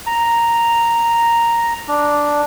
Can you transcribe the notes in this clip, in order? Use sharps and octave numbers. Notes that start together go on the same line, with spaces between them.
A#5
D4